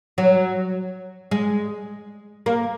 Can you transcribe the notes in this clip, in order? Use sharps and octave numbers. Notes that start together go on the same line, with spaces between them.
F#3
G#3
A#3